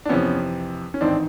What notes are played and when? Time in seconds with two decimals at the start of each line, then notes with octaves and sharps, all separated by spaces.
0.05 D4
0.09 F2 C3 E3 B3 C#4
0.94 C#4
1.01 A1 G#2 D#3 C4 D4